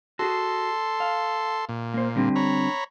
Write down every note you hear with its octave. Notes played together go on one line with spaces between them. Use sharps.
F#4 G#4 A4 C6
F5
A#2
A#3 C5
D3 G3 C4
C#5 A#5 B5